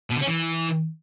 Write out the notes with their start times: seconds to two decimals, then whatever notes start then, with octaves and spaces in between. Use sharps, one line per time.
0.11 B2
0.17 D3
0.22 C#4
0.28 E3